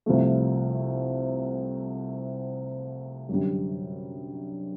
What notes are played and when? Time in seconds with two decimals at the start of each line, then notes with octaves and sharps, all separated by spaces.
0.06 C2 C3 F3 A3
3.29 F#2 D3 G3